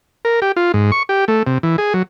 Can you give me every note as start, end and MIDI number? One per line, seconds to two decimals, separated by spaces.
0.25 0.40 70
0.42 0.52 67
0.57 0.72 65
0.74 0.91 44
0.92 1.03 85
1.09 1.25 67
1.28 1.43 57
1.47 1.58 48
1.63 1.76 52
1.78 1.93 68
1.94 2.03 54